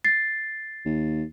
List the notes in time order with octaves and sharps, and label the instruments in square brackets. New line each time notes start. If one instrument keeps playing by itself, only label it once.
[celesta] A6 C7
[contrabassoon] D#2